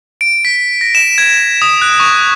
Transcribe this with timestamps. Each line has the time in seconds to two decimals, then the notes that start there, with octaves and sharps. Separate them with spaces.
0.21 D7
0.45 B6
0.81 A#6
0.95 E7
1.18 G#6
1.62 D#6
1.82 F#6
2.00 C#6